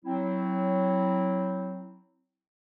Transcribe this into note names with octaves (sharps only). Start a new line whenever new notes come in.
F#3 C4 E4